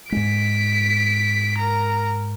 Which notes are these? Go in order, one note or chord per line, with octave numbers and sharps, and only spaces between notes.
G#2 G#3 B6 D7
A#4 A#5